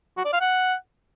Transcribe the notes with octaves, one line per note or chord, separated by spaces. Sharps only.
F#4
D5
F5
F#5